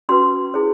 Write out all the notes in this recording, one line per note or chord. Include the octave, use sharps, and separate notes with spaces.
C#4 F#4 B4 C6
E4 G#4 C5